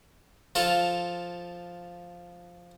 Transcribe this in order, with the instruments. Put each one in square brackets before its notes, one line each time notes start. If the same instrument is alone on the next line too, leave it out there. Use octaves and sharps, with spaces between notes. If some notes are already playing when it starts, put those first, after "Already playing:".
[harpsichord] F3 F4 A4